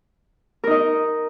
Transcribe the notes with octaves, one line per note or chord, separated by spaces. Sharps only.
D#4 A#4 D#5